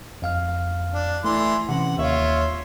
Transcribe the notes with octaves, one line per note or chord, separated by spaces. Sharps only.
F2 F5 F6
D4
E3 A3 D5 C6
C3 E3 C#4 F#5
D#2 F4 C#5 E5